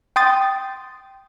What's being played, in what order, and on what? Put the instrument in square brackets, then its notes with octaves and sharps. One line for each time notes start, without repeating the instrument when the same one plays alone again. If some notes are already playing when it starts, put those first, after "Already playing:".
[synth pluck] G5 C6 D#6 A6